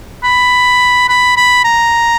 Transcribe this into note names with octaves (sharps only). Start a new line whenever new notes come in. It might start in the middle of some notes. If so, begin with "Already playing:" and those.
B5
B5
B5
A#5